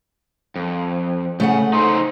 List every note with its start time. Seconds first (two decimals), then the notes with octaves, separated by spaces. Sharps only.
0.56 F2
1.40 C#3 A3 G#4 F#5
1.73 D#4 A4 C5 C6